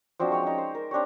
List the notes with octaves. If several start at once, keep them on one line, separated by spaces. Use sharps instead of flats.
F3 C4 D4 F#4
G#3 C#5 G5 C6
C#4 D#4
C5
A#4
C4 D4 G4 C#5